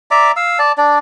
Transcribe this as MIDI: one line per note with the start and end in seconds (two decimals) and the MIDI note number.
0.11 0.32 74
0.11 0.32 76
0.11 0.32 82
0.11 0.32 86
0.36 0.59 77
0.36 0.59 88
0.59 0.72 74
0.59 0.72 81
0.78 0.99 62
0.78 0.99 74